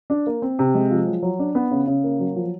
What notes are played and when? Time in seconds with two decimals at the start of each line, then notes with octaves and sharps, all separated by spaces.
0.10 D4
0.27 A#3
0.42 C4
0.59 C3
0.75 G#3
0.91 F3
1.07 F#3
1.23 F#3
1.39 D4
1.55 B3
1.71 C#3
1.87 C#3
2.04 A#3
2.19 F#3
2.36 F3